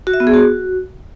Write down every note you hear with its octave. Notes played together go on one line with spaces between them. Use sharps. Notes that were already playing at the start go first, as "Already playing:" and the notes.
F#4
E5
B3
G#4
F#4